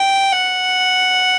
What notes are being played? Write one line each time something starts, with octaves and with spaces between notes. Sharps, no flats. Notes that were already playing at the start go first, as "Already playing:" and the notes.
Already playing: G5
F#5